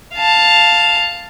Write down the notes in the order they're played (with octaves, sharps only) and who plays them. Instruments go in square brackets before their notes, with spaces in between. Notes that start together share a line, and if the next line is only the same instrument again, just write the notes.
[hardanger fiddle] F5 A5